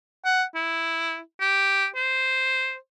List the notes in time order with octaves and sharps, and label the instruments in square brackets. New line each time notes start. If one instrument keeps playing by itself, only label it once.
[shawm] F#5
E4
G4
C5